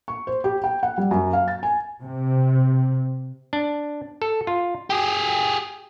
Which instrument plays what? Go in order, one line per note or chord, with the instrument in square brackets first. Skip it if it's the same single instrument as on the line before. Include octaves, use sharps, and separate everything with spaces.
[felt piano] C#6
C5
G4
G5
F#5
G3
F#2
F5
A6
G#5
[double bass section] C3
[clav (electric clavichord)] D4
A4
F4
[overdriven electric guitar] G4 G#4